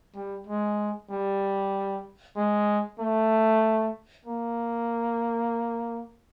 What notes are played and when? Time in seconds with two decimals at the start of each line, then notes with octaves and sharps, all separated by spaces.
0.15 G3
0.47 G#3
1.10 G3
2.36 G#3
2.99 A3
4.25 A#3